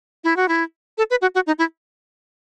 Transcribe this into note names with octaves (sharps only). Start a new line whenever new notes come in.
E4
F#4
E4
A4
B4
F#4
F#4
D#4
E4